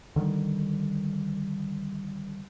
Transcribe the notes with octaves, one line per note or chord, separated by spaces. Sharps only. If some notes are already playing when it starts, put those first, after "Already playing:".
D3 D#3 G3